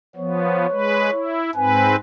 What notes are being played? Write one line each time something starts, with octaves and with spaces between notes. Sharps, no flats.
F3 B3 C#5
G#3 B4
E4
G#2 C4 B4 G#5